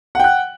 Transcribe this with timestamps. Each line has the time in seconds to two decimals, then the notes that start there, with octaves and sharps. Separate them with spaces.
0.15 F#5
0.20 G5
0.24 F#6